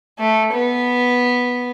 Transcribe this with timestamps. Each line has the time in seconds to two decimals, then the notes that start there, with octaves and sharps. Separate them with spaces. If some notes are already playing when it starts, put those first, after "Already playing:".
0.19 A3
0.54 B3